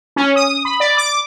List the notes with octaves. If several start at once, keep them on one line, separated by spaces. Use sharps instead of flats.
C#4
D#6
B5
D5
D6